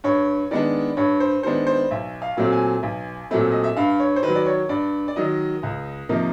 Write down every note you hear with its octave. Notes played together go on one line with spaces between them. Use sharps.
G2 C#5
D#3 G#3 B3 D4 D5
G2 C#5
C5
D#3 G#3 B3 D4 C5
C5
B1 E5
F5
A#2 F#3 A3 C4
G#5
B1
A#2 F#3 A3 C4
D#5
E5
G2 F5
C#5
C5
D#3 B4
F#3
D5
C#5
G2 D5
D5
D#3 F#3 D#5
C#2
C3 F3 A#3 D#4